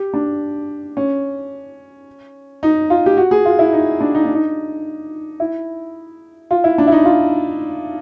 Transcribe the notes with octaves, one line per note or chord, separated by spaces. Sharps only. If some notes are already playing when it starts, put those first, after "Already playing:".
Already playing: G4
D4
C#4
D#4
F4
G4
F#4
G#4
F4
E4
D#4
D4
D#4
D4
D#4
E4
F4
E4
D4
E4
D#4
F4